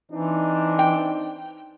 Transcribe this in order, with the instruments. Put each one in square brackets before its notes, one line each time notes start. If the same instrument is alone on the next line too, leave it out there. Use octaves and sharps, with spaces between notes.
[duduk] E3 [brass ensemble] C4 D4 D#4
[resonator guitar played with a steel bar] G5